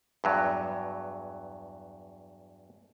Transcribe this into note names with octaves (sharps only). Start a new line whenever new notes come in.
E2 G2 F#3